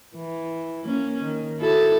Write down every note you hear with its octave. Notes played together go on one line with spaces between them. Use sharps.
E3
A#3 C#4
D#3
E4 F#4 A4